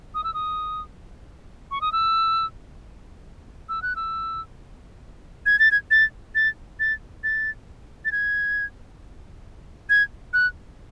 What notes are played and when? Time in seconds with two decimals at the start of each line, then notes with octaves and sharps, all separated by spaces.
0.15 D#6
0.24 E6
0.34 D#6
1.71 C#6
1.81 D#6
1.92 E6
3.69 E6
3.82 F#6
3.96 E6
5.46 G#6
5.59 A6
5.71 G#6
5.91 A6
6.35 A6
6.80 A6
7.24 A6
8.05 A6
8.12 G#6
9.90 G#6
10.33 F#6